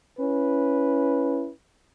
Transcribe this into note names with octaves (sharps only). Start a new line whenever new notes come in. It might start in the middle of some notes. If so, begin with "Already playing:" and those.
C#4 E4 B4